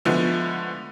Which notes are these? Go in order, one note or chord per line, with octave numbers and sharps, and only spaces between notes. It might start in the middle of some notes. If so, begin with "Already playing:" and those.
D3 F3 G#3 A3 B3